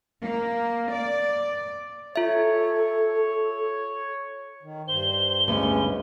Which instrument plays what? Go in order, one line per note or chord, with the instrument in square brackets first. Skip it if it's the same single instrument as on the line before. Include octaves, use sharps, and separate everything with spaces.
[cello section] A#3
D5
[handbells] F4 E5 [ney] A4 [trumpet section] C#5
[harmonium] D#3
[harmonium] G2 C5 [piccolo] G7
[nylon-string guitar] D2 G2 B3 [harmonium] G#3 C#4